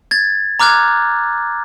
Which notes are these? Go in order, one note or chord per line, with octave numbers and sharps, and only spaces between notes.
G#6 A6
A#5 D6 F6 F#6 G#6